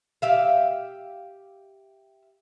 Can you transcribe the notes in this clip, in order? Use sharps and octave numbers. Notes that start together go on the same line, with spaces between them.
G4 E5 F5